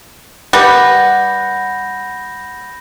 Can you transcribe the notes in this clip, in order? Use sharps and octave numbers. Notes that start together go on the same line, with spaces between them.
G3 B4 F#5 B5 G6 A#6